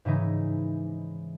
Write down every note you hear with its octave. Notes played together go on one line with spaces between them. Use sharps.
G#2 C#3 E3 D#4